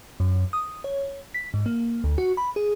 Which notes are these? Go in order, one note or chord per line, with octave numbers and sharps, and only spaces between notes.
F#2
D#6
C#5
B6
G#2
A#3
D2
F#4
B5
G#4